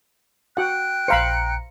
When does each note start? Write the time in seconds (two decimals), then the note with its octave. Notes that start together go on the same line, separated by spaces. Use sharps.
0.57 F#4 F#5 G5 F#6
1.08 A#1 C5 F5 A#5 B5 C#7